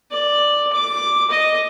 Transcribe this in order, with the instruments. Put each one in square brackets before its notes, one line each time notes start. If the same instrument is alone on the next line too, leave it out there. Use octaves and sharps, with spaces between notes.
[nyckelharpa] D5
D6
D#5